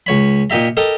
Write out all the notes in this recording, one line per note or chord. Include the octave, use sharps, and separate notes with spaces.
C#2 C#5 B5
A#2 D#4 G4 E5 A#5
G4 A4 A#4 D#5